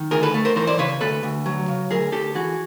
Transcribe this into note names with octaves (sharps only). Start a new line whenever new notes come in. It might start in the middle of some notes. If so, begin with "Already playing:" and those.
Already playing: D#3
D2 G#4 A#4
A4 B4
A3
A#4 C5
E3 A#4 C5
C5 D5
C#3 B4 C#5
D2 A4 B4
D2
F#3
C#3
D2 G#4 A#4
D2 G4 A4
E3 F#4 G#4